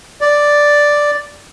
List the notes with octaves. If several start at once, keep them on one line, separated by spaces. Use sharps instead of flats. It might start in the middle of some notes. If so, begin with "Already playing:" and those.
D5